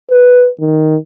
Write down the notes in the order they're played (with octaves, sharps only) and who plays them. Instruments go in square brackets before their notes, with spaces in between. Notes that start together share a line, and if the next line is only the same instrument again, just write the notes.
[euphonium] B4
D#3